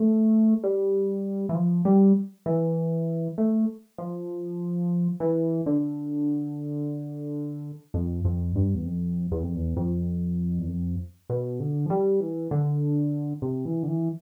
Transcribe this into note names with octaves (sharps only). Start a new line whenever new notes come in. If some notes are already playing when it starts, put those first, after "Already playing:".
Already playing: A3
G3
E3
F3
G3
E3
A3
F3
E3
D3
F2
F2
G2
E2
F2
E2
F2
E2
F2
E2
F2
B2
D3
F3
G3
E3
D3
C3
E3
D3
E3